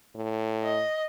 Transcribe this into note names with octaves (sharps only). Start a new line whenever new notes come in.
A2
D#5